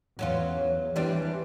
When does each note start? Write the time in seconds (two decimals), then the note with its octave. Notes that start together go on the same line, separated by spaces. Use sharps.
0.19 E2 F#3 C#4 F4
0.96 E3 G3 C4 D4